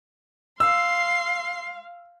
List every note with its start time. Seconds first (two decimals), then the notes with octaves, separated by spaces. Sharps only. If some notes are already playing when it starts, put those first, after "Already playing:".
0.60 F5 C6 E6 C7